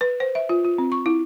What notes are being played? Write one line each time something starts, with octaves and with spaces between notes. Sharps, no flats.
B4
C5
E5
F4
F4
C4
C#6
E4